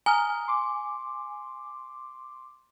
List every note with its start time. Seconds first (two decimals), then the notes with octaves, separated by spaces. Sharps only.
0.06 G#5 A#5 D#6 F6
0.48 C6 D6